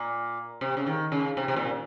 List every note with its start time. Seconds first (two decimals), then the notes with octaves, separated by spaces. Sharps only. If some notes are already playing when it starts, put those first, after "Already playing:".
Already playing: A#2
0.61 C3
0.77 C#3
0.86 D#3
1.12 C#3
1.37 C3
1.48 C3
1.56 A#2